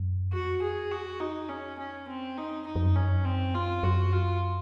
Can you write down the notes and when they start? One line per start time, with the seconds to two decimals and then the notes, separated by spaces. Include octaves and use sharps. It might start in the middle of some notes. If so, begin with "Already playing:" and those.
Already playing: F#2
0.33 F2 F#4
0.62 G#4
0.91 F#4
1.20 D#4
1.49 C#4
1.79 C#4
2.08 C4
2.37 D#4
2.66 F#2 D#4
2.75 F2
2.84 F#2
2.95 C#4
3.25 C4
3.54 F4
3.83 F#2 F#4
4.13 F4